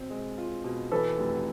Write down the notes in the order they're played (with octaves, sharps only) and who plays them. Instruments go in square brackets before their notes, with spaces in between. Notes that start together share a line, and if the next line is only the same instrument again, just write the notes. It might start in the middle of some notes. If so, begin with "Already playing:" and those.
Already playing: [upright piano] B2 C4
G#3
F4
B2
[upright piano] E3 [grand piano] A4 B4
[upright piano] F1